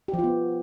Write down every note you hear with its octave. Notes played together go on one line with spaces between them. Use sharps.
G4
F3
F4
B3